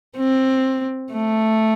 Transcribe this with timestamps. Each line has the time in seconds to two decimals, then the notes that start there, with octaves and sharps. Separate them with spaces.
0.18 C4
1.13 A3